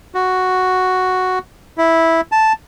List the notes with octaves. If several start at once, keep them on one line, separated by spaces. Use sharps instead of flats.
F#4
E4
A5